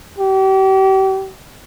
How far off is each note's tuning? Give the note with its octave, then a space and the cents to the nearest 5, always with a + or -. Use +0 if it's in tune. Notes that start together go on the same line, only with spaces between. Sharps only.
G4 -35